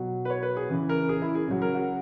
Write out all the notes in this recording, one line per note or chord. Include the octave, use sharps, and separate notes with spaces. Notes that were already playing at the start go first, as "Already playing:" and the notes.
Already playing: B2 F#3
B4
C#5
B4
G#4
C#3 E3
A#4
G#4
E4
G#4
C#3 F#3
A#4
F#4